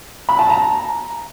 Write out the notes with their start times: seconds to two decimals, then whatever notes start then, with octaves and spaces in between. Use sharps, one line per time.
0.29 B5
0.39 A5
0.49 A#5